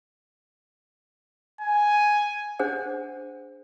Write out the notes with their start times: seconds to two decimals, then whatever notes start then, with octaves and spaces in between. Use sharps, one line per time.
1.61 G#5
2.59 D4 G#4 C5 F#5